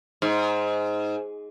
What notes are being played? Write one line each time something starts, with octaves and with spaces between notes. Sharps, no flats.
G#2